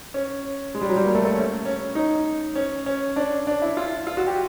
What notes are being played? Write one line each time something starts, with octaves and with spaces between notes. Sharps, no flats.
C#4
G#3
G3
F#3
G3
A#3
A3
A3
C#4
C#4
D#4
C#4
C#4
D4
D4
E4
F4
F4
F#4
G4